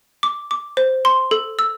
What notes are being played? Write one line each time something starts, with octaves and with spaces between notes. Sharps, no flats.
D6
D6
C5
C6
A4
E6